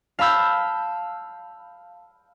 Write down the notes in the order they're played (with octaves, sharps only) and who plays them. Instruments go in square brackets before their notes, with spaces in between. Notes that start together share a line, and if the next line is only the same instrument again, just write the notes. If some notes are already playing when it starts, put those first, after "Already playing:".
[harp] F5 A5 B5 E6 G6